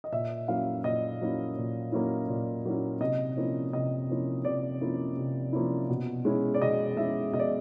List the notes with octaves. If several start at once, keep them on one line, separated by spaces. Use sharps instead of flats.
D#5
A#2 E5
F#3 A#3 C#4 E4 F5
A#2 D#5
F#3 A#3 C#4 E4
A#2
F#3 A#3 C#4 E4
A#2
F#3 A#3 C#4 E4
C3 D#5
F3 A#3 C#4 E4
C3 D#5
F3 A#3 C#4 E4
C3 D5
F3 A#3 C#4 E4
C3
F3 A#3 C#4 E4
B2
G#3 C#4 E4
D5
B2 D#5
G#3 C#4 E4 E5
B2 D#5
D5